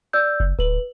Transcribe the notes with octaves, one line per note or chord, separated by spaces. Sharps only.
D5 E6 G6
F#1
D1 B4 F#7